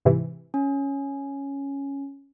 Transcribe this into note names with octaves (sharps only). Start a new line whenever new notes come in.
G#2 C3 E3
C#4